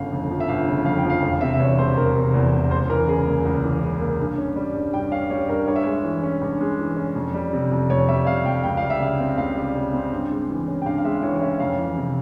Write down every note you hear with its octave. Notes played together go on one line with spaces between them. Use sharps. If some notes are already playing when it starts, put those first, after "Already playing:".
Already playing: G1 C#3 F5
F2
F3
E5
G1 F5
C#3
F2 F5
G5
F3
F5
E1 F5
C3 E5
E5
E2 C#5
E1 C5
E1 A#4
C3
E2
E1
C#2 C5
E3 A#4
C#3 G#4
A#3
C#2
E3
C#3
A#3
G2
C#4
G3
G2
G2 G5
C#4 F5
G3 C#5
G2 A#4
G2 C#5
E5
G#3 C#5
E3
C#4
G2
G#3
E3
C#4
F2
G3
C3
F2
F2 C#5
G3 E5
C3 F5
F2 G5
C#2 G5
F5
G3
E5
C#3 F5
C4
C#2 F5
G3
C#3
C4
G2
G#3
E3
C#4
G5
G2 F5
F5
G#3 E5
E3 C#5
C#5
C#4 E5
F2 F5
E3
C3